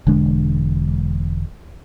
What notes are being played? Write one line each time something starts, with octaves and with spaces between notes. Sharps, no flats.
E1 D3 G#3 D4